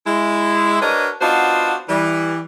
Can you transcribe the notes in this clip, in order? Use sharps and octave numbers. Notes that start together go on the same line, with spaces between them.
G#3 E4
D4 F#4 A#4 B4 C#5 D#5
B3 D4 D#4 F4 F#4 C5
E3 G3